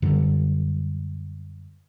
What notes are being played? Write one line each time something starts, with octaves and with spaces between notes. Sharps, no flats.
F#2 D3 G3